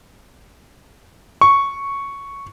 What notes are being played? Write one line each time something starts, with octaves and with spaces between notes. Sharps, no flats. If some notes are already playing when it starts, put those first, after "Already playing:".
C#6